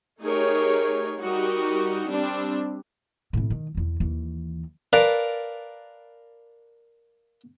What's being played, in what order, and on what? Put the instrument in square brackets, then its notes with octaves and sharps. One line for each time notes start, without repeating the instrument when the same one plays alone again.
[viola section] A3 D#4 G4 G#4 A#4 C#5
G3 D#4 F#4 G4 A#4
G3 C4 D4
[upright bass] A2 C3
D#3
E2 E3
D#2 E3
[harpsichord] A#4 B4 D5 F5 A5